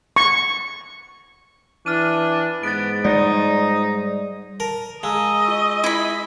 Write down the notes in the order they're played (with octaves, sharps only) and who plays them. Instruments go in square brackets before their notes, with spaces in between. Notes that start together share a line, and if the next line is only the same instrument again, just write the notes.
[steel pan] C#6
[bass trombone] E3 [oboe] D4 [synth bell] F6 D#7
[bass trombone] G#2 [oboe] B3 [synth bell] A6 D7
[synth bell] G3 D5 [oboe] D#4
[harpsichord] A#4 [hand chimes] A5
[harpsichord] G#3 [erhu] D#5 [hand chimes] F5 A#5 E6
[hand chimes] F4 C#6 E6
[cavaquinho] E4 B5